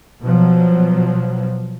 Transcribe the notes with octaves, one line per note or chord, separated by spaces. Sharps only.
B2 F3 F#3